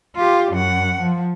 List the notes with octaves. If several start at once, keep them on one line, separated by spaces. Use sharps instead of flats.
F4 G4
F#2 F#5
F3